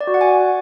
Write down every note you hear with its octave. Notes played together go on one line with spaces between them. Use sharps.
D5
F#4
F#5
G#5